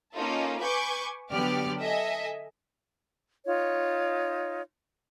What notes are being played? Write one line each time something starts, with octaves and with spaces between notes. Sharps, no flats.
A#3 C#4 D#4 F4 A4
B4 G#5 C#6 D6 G6
D3 F#3 B3 G4 D5 F6
A4 D#5 E5 G#5
D#4 F4 C#5